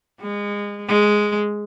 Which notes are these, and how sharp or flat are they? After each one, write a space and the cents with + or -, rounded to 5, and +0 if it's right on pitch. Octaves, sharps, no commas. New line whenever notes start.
G#3 -25
G#3 +0